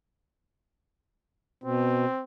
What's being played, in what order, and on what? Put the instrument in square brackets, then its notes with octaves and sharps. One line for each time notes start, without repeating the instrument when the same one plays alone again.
[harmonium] B2 [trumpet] C4